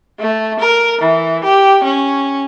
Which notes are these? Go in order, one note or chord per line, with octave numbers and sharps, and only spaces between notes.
A3
A#4
E3
G4
C#4